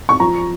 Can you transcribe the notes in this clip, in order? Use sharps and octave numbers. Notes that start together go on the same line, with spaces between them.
C#6
F3 A#5